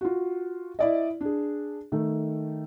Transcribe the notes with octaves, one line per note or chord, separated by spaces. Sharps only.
F4 F#4
E4 D5 D#5
D4 G#4
D#3 A3